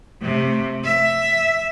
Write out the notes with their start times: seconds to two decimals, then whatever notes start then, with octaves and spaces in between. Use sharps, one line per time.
0.22 C3 A3
0.84 E5